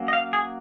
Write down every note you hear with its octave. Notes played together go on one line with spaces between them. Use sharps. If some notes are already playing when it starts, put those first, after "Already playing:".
Already playing: F#3 A#3 C#4
D#5
F5
G#4